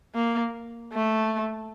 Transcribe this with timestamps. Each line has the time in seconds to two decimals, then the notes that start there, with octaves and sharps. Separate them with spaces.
0.15 A#3
0.93 A3